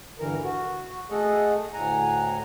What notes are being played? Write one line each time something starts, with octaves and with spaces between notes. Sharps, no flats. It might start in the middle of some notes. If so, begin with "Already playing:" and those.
G2 D3 E3 A#4
F#4
A3 G#4 A4 D#5 F#5
D2 A2 F#5 G#5 A#5